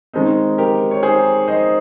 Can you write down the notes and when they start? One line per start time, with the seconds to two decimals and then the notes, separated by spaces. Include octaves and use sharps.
0.14 D#3 G#3 C4 D#4
0.58 G4 A#4
0.91 C#5
1.03 G#4 C5
1.48 C5 D#5